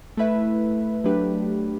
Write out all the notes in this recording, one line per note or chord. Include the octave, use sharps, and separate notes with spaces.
A3 E4 B4 E5
F#3 A3 D4 G4 B4